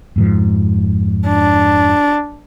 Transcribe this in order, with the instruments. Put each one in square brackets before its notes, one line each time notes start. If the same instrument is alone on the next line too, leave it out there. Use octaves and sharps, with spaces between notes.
[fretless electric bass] F2 G#2 F3
[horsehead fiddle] D4